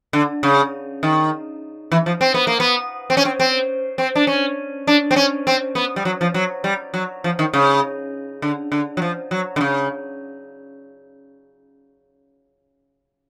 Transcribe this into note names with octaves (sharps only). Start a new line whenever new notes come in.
D3
C#3
D#3
E3
F3
C4
B3
A#3
B3
C4
C#4
C4
C4
C4
D4
C#4
D4
C4
C#4
C4
B3
G3
F#3
F3
F#3
G3
F#3
F3
D#3
C#3
D3
D3
F#3
F3
F#3
D3
C#3